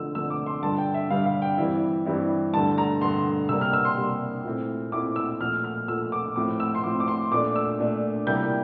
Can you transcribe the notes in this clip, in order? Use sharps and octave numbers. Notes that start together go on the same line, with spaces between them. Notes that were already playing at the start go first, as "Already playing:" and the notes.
Already playing: D3 F3 A3 E6
D3 F3 A3 E6
D6
C6
G2 D3 G3 A5
G5
E5
G2 D3 G3 F5
F5
G5
G2 E3 G3 C4 E4
G2 E3 G3 C4 E4
G2 D3 A3 A5
A#5
G2 D3 A3 C6
C3 G3 A#3 E6
F6
E6
C6
C3 G3 A#3
A#2 A3 C4 E4
A#2 A3 C4 E4 D6
E6
A#2 F3 A3 F6
F6
A#2 F3 A3 E6
D6
A2 F3 C4 D6
E6
C6
A2 F3 C4 D6
D6
C6
A#2 A3 D4 D6
E6
A#2 A3 D4
C3 G3 A#3 E4 G6